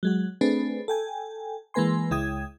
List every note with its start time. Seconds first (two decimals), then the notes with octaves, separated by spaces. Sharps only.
0.03 F#3 G#3 F#4
0.41 A3 C4 D4 G#4 B4
0.88 A4 G5 G#5
1.74 E3 G#3 A#3 B4 G#5 C6
2.11 C#2 G#3 E4 G5 D#6 G#6